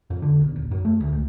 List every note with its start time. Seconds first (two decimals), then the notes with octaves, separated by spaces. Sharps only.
0.10 F2
0.22 D3
0.41 B1
0.56 D#1
0.71 F#2
0.85 A3
1.00 D2
1.13 C#2